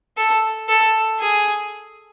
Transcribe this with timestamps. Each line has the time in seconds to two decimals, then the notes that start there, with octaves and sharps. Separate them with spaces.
0.17 A4
0.68 A4
1.19 G#4